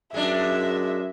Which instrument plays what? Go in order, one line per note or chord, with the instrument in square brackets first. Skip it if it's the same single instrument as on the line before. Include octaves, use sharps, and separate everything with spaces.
[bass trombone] F#2 [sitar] G#3 D4 [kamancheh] E5